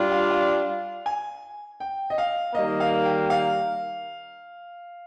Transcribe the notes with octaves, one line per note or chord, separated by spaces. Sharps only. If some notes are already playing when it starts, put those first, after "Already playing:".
Already playing: G3 D4 F4
F5
F5
G#5
G5
D#5
F5
D#3 G3 A#3 D#5
F5
G5
F5